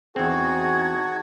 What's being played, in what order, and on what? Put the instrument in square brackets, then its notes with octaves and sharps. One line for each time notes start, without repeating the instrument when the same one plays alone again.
[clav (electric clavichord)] E2 C4 [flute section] D#4 A5 G#6 [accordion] F#4 [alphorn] G#4